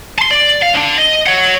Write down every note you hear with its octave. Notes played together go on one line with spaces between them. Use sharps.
A5 C6
D5
F5
D3 D4
D#5
C#5 F#5